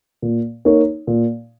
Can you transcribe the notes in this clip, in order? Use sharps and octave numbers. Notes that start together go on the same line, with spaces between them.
A#2
A#3 D#4 A#4 C#5
A#2